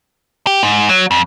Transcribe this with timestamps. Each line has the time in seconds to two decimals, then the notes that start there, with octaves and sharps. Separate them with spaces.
0.47 G4
0.63 G#2
0.89 F#3
1.11 F2